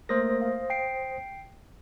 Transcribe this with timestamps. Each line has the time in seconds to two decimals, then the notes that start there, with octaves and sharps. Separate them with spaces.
0.09 A3 A#3 A#4 C5 D#6 A#6
0.42 F5
0.70 G5 C7 D7